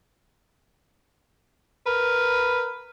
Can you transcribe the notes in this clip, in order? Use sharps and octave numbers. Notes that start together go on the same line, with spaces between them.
A#4 B4